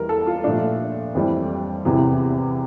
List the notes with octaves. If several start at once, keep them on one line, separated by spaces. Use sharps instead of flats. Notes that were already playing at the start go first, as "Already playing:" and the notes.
Already playing: E2 E3 G3 A#4
A4
F4
A#2 F3 A3 D4
F2 E3 G3
E2 C3 E3